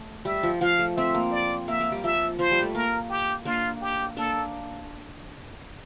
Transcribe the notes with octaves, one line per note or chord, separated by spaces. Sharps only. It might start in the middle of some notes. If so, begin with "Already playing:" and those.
Already playing: A3
G3 E5
F3
F3 F5
A3
A3 C4 E5
A#3
D5
A#3 E5
A#3
G3
F3 E5
F3 C5
G3
A3
A#3 A#4
G4
A#3 D4 F4
G4
A#3 D4 A4